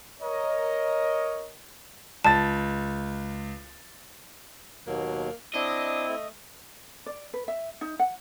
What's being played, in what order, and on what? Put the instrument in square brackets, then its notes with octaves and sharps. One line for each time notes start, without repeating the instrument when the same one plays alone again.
[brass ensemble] A#4 C#5 D#5
[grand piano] C#2 A6 [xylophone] A5
[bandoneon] D#2 B2 F#3 [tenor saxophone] A#3
[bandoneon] C4 E4 [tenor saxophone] D4 [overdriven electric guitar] D#5
[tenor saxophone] A3
[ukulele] D5
B4
E5
D#4
F#5